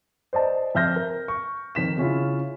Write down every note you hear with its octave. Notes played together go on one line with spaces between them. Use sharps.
C5 D5 D#5 A5
F2 E5 F6 G6 A#6
A#4
C#6
F2 D#3 B6 E7
C#3 C#4 E4 F4